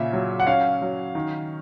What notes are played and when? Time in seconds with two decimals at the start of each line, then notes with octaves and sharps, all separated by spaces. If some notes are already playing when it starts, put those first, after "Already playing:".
Already playing: A#2 C#3 E5
0.13 F#3
0.40 F#5
0.47 C#4 F5
0.82 F#3
1.15 D#3